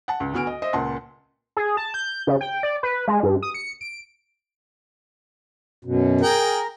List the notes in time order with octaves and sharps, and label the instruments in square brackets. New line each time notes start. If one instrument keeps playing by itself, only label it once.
[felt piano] F#5 A5
C#2
D2 B3 F#4 G#5 F6 D7
D#5
C5 D#5 E5
C#2 A#2 F#5 A5 C6
[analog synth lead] G#4
A5
G6
C#3
G5
D5
B4
G#3
G2
D#6
C#7
D7
[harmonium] F#2 B2
[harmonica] G#4 G5 [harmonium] A#4